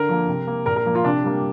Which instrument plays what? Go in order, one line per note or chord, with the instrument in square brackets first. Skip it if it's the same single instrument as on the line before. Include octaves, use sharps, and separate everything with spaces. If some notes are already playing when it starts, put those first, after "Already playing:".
Already playing: [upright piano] D3 A#4
F3 A#3
C3
A#3
A#2 A#4
A#4
F3 A#3
F4
C3 D4
G3 A#3